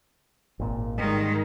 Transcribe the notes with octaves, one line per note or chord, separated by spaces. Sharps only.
G#1 A#2
G#2 D#3 G3 G#3